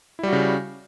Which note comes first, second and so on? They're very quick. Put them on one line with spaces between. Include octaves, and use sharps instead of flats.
E4 G3 F#4 C#3